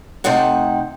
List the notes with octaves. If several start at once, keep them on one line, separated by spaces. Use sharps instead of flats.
C3 A3 C4 D#4 F#5